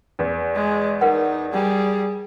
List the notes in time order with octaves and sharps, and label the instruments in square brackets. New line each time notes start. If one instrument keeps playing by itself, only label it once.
[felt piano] E2
[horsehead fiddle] G#3
[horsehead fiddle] D#4 [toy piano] A#4 B4 F#5
[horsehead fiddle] G3 G#4